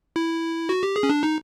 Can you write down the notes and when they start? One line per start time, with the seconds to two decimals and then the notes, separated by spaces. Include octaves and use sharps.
0.16 E4
0.69 F#4
0.83 G4
0.96 G#4
1.03 C#4
1.10 D4
1.23 D#4